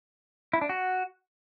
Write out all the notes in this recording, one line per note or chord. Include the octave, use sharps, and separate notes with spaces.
E4
D4
F#4